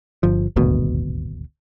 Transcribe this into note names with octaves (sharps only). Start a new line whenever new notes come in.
G1 F3
D#1 G#1 D2 B2